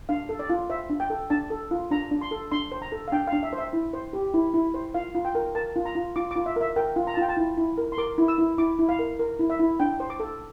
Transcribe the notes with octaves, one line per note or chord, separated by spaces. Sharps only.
D4 F5
A4
D5
F4
C5 E5
D4
G5
A4
D4 A5
A4
F4
D4 A#5
D4
C6
A4
D4 C6
C5
A#5
A4
F5
D4 G5
F5
D4
E5
C5
E5
E4
C5
G4
E4
E4
C5
F4 F5
F4
G5
A#4
A#4 A5
F4
A#5
F4
F4 D6
F4 D6
E5
A#4 E5
A#4 G5
F4
A#5
A5
F4 G5
A5
E4
E4
A#4
C6
A#4 D6
E4
E6
E4
E4 D6
E4
F5
A#4
A#4
E4
E5
E4
D4 G5
C5
D6
A4